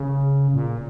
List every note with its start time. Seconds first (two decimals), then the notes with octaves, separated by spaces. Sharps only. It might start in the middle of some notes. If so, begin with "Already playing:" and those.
Already playing: C#3
0.54 A#2